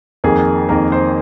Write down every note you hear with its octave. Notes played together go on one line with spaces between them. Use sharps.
F2 D#3 A#3 G#4
F2 D#3 A#3 A#4
C5